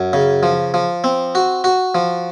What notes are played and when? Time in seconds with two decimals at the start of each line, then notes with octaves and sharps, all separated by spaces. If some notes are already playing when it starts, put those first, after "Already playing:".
Already playing: F#2
0.13 C#3
0.43 F3
0.74 F3
1.04 C4
1.35 F#4
1.64 F#4
1.95 F3